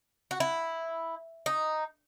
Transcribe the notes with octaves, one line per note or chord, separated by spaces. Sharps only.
F#4
E4
D#4